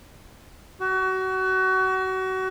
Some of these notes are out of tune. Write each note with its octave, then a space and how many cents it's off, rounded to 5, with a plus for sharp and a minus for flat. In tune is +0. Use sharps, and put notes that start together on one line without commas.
F#4 +30